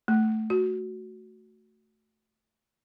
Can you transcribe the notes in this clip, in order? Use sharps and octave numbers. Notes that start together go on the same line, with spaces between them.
A3
F#4